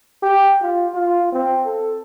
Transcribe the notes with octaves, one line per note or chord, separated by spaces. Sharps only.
G4
F4
F4
C4
A4